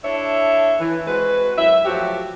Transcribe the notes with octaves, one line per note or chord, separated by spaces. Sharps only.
D4 E4 A4 C#5 E5
E3
G#3 C4 F#4 B4
F#2 E5
F3 F#3 A3 F#4 G4